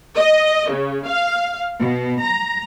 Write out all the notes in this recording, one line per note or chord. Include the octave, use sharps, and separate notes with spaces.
D#5
C#3
F5
B2
A#5